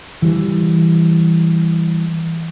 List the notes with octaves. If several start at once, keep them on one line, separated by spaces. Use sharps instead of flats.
E3 G3